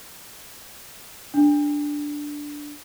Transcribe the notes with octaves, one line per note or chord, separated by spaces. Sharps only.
D4